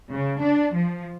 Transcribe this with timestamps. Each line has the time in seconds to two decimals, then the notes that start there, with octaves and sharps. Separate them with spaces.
0.12 C#3
0.41 D4
0.74 F3